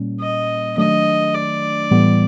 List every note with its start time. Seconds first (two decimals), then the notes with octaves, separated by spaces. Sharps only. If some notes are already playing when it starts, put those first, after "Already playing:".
Already playing: A#2 G3 A#3 C#4
0.21 D#5
0.77 D#3 F#3 A3 D4 D#5
1.34 D5
1.91 A2 E3 G3 B3